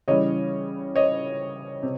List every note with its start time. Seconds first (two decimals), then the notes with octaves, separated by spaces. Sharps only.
0.08 C#3 E3 G3 C#5 D#5
0.96 C#5 D#5
1.83 C3